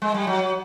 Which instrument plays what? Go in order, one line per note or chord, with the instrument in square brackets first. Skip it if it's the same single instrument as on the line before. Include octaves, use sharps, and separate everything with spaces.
[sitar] G#3
G3
F#3